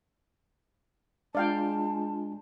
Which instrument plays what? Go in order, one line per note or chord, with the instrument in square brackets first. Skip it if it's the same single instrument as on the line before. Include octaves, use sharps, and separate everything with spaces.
[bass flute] G#3 [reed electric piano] D4 F4 [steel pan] D5 F5 G5 [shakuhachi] A5